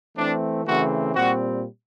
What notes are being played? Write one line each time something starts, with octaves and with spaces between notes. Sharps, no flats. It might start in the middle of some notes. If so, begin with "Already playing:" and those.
E3 A3 C4 D4
C#3 E3 A3 C4 F#4
A#2 G3 C4 F#4